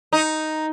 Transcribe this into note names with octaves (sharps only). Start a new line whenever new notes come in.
D#4